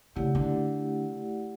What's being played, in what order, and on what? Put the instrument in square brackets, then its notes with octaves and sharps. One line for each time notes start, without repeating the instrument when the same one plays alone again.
[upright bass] C#3 [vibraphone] A3 E4 G4 D5 F#5
[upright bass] D3